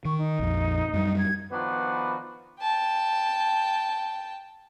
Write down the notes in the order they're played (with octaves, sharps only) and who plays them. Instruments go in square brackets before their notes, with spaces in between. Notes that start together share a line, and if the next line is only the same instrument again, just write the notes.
[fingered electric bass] D#3 [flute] C#6
[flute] D#4
[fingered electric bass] A#1 F2
F#2 G3
[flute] G#6
[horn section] D#3 F3 B3 D4 F#4 B4
[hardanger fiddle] G5 A5